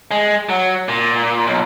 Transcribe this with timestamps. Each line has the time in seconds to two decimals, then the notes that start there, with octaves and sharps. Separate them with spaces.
0.11 G#3
0.49 F#3
0.89 A#2
1.47 B1